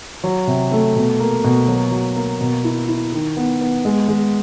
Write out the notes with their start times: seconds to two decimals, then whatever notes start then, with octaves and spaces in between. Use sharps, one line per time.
0.24 F#3
0.47 C3
0.72 A3
0.96 B2
1.20 A#3
1.44 B2
1.68 F#3
1.91 F#3
2.16 A#3
2.41 B2
2.64 E4
2.88 E4
3.12 D#3
3.37 B3
3.61 B3
3.85 G#3
4.08 G#3